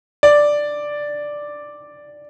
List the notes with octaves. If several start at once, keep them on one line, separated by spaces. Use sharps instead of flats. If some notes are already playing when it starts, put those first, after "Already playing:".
D5